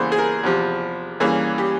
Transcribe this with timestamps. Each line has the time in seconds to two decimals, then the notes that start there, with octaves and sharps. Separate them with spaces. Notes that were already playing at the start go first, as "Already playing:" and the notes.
Already playing: E2 C#3 E3 G3 A#3 C5
0.12 G#4
0.19 A#4
0.43 E2 C3 F3
1.20 G2 E3 A#3 C#4 G#4
1.58 G4